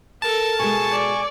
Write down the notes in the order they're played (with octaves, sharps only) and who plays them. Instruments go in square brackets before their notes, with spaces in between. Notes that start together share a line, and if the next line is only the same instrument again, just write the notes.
[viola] A4 A#4 [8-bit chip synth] A5
[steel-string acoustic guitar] B2 G#3 [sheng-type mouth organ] G#5 C#6
[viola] D5